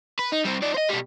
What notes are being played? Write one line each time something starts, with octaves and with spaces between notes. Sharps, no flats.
B4
D#4
G3 C4
D#4 D5
C5 D#5
B2 G3